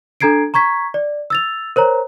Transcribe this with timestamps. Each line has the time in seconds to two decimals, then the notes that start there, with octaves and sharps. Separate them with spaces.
0.20 D4 A4 A#5 G#6 C7 D7
0.54 A#5 C#6 G#6 B6
0.94 D5
1.30 E6 A6 F7
1.76 A#4 C5 C#5 A#5